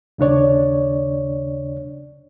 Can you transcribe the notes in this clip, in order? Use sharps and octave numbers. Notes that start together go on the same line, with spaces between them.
D#2 C#3 D4 C#5 D5